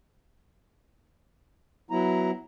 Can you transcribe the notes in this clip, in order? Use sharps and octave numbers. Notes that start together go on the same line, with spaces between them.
F#3 B3 E4 A#5